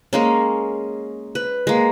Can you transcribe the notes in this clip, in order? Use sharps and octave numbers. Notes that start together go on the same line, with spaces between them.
G#3 A#3 C#4
B4
G#3 A#3